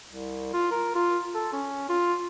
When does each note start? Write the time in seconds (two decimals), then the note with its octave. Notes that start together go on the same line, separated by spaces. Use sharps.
0.09 C2
0.53 F4
0.71 A#4
0.95 F4
1.34 A4
1.53 C#4
1.89 F4